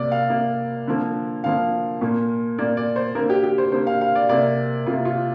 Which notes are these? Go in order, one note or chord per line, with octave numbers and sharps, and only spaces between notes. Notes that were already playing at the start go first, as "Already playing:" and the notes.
Already playing: C3 A#3 D5
F5
C3 A#3
D3 F3 A#3
D3 F3 A#3 F5
A#2 A#3
A#2 A#3 D5
D5
C5
D3 A#3 A#4
G4
G4
C5
D3 A#3 C5
F5
F5
D5
C3 A#3 D5
C3 A#3 F4
F4